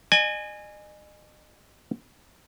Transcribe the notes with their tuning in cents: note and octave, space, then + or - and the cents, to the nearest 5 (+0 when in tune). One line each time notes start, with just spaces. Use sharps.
D#5 -40 G#5 +0